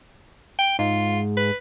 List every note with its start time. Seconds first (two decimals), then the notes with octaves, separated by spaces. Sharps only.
0.59 G5
0.79 G#2 F4
1.37 B4